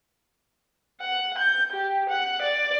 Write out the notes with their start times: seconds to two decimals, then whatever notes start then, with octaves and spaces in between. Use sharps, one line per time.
1.01 F#5
1.38 G6
1.73 G4
2.09 F#5
2.42 D5